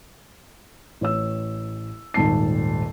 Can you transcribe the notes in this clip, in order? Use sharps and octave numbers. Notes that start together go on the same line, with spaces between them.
A1 C#5 E6
D#1 G#1 A5 C7